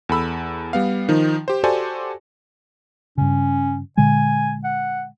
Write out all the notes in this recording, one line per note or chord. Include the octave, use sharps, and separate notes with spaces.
E2 A4 B5 E6
G3 B3 F5
D#3 F3 D#4
G4 C5
F#4 G4 A4 C5 D5 G#5
G2 C#3 C#4
A#2 D3 G#3 G#5
F#5